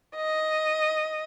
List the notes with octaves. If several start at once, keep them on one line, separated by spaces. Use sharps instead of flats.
D#5